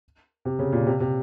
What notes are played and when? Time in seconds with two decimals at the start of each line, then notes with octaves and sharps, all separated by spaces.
0.45 C3
0.59 C#3
0.72 A#2
0.87 C3
1.00 C3